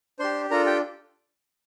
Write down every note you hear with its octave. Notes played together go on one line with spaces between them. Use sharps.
D4 G4 C5 C6
D4 F4 A4 A#4 A#5
G4 G5